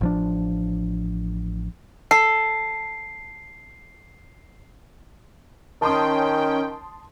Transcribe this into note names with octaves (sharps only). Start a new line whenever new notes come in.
A1 F3 D4
A4 C7
D#3 C#4 G5 A5 C6 D#6